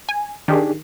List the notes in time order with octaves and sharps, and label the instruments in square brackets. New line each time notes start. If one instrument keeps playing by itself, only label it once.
[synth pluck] G#5
[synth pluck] D#3 [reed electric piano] D4 G4 G#4